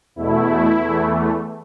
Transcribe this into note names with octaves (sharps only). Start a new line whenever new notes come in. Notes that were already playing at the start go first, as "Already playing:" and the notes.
E2 B2 A3 E4
E2 E3 A3